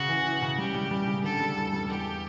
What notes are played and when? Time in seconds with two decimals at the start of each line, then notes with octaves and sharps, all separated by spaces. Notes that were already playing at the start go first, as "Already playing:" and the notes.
Already playing: C#3 F#4
0.08 E3
0.25 E3
0.42 C#3
0.58 G3 G4
0.75 G3
0.91 G3
1.07 C#3
1.24 D3 A4
1.40 G3
1.56 E2
1.73 G3
1.89 E2 G4